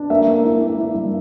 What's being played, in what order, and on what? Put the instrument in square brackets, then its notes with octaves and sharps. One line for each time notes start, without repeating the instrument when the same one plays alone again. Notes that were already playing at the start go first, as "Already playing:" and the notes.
Already playing: [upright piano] D4
A#3 E5
A#3
E4
A#3
E4
G2